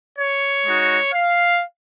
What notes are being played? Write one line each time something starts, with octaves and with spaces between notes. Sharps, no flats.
C#5
G#3 D#4 F#4
F5